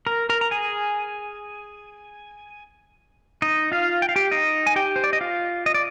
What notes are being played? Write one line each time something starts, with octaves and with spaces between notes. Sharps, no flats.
A#4 A#5
A#4 A#5
A#5
G#4 G#5
D#4 D#5
F4 F5
G5
F5
G4 G5
D#4 D#5
G#5
G4 G5
C5
D5
D#5
F4 F5
D#5
D5